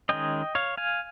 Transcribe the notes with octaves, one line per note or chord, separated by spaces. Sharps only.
D#3 G#3 C#4 D#5 G5
C#5 F5
F5 G#5